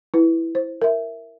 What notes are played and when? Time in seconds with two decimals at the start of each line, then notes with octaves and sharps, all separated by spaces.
0.14 E4 B4
0.55 C5
0.82 A#4 E5